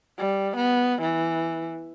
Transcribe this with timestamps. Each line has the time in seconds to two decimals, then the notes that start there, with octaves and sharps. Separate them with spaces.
0.18 G3
0.56 B3
1.02 E3